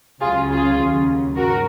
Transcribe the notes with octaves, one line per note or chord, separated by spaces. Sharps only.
C#2 C#3 F#3 F4 G#4
F4 G#4
D#2 C#3 F#3
G#2 F#3 F#4 A#4